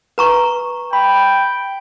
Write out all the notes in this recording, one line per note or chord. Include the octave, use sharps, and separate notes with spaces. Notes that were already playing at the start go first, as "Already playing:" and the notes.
B4 A#5 C#6
G5 B5